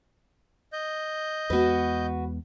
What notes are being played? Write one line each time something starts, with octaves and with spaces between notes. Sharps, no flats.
D#5 G6
E2 G#3 B3 F#4 B4